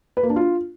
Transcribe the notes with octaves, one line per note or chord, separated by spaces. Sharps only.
B4
A#3
D4
F4